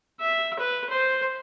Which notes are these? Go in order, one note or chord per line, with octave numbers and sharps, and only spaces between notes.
E5
B4
C5